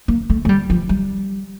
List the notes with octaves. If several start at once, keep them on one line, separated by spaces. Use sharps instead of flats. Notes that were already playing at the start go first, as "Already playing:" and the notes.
A#3
A3
A3
G3
F3
G3